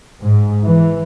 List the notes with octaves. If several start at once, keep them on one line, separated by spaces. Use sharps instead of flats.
G#2
E3